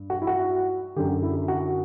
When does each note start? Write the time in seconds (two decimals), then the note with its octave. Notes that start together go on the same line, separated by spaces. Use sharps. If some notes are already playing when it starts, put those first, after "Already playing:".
Already playing: G2
0.10 F#4
0.22 E4
0.27 F#4
0.96 F#2 D3 G4
1.23 E4
1.48 F#4